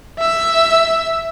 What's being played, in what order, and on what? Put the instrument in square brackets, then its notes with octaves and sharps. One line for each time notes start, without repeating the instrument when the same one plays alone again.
[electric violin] E5 E6